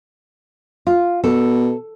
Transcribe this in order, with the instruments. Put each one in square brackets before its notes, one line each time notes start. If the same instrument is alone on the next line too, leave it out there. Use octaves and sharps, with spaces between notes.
[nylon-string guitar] F4
[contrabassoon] B2 [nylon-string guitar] A4